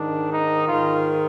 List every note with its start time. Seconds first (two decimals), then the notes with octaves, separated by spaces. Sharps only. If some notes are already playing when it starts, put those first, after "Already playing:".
Already playing: G#2 D#3 D4
0.31 D#4
0.68 G#2 D#3 F4